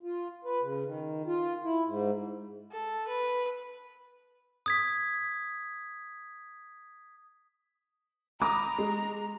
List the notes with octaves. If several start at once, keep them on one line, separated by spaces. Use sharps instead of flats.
F4
B4
C#3
D#3
F4
E4
G#2
A4
B4
D#6 G#6 B6
A#5 B5 D6 D#6
G#3